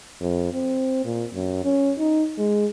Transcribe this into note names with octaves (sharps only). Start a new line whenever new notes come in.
F2
C4
A#2
F#2
C#4
D#4
G#3